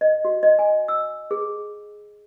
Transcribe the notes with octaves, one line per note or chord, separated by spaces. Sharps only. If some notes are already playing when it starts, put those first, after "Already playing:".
D#5
F#4
D#5
G#5
E6
G#4